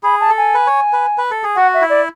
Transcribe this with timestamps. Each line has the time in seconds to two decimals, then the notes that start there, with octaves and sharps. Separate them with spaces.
0.03 G#4 B5
0.20 A5
0.29 A4
0.38 G#5
0.54 B4
0.67 C#5
0.93 B4
1.18 B4
1.31 A4
1.44 G#4
1.56 F#4 F#5
1.74 E5
1.82 E4
1.90 D5